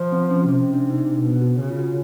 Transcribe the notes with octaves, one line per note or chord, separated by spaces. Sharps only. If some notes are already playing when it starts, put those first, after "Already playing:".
Already playing: F3
C4
C#4
C3 C#4
D4
D#4
D4
B2
F#4
C#3 F#4
F4
F#4